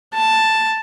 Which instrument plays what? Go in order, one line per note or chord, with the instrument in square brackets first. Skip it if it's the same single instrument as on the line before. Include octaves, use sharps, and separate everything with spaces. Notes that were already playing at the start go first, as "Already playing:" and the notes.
[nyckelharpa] A5